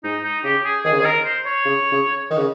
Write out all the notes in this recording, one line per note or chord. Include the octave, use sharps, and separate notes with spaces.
G#2 D#4
D#4
C#3 G4
G#4
D#3 G#4
C#3
D#3 G#4
A#4
C5
C#5
C#3
C#3
D#3
C#3